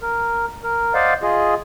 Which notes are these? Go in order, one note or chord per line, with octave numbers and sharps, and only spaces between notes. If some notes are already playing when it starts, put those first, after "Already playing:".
A#4
A#4
C5 D5 D#5 F5 F#5
F4 G#4 D#5